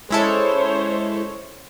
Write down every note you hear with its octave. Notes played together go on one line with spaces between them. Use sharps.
G#3 C#4 E4 A4 C5 C#5